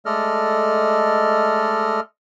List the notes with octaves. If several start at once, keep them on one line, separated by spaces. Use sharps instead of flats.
G#3 A3 A4 D5 D#5 F6